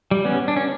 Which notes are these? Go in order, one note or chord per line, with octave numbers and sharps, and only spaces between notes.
G3
B3 C#4
D4
C#4